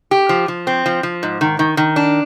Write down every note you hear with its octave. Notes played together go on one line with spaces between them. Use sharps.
G4
F3
F3
C4
F3
F3
G#2
D#3
D#3
D#3
D4